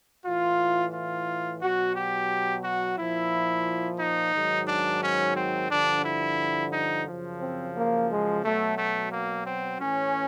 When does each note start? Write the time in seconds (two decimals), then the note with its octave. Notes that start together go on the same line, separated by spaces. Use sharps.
0.25 A2 E3 F4
0.94 F4
1.61 B2 F#3 F#4
1.95 G4
2.64 F#4
2.98 A#2 F3 E4
4.00 D#4
4.34 G#2 D#3 F#3
4.68 D4
5.03 C#4
5.37 C4
5.71 G2 D3 F3 D4
6.05 E4
6.73 D#4
7.08 F#2 C#3 F3
7.41 C4
7.76 A#3
8.09 G#3
8.44 B2 F#3 A3
8.78 A3
9.12 A#3
9.46 C4
9.80 A2 E3 C#4